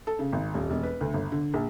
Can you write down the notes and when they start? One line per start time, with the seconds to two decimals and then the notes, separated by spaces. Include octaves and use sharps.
0.07 A4
0.19 C#3
0.32 G#1
0.54 D#1
0.70 E1
0.83 B4
1.01 D2
1.14 G1
1.32 D3
1.54 A#1